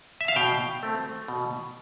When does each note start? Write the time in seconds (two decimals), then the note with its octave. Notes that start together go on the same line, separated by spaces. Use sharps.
0.21 E5
0.28 F5
0.36 B2 G5
0.83 A3 C4
1.28 B2